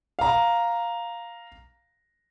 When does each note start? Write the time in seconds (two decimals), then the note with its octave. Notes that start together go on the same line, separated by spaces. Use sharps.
0.19 F5 A#5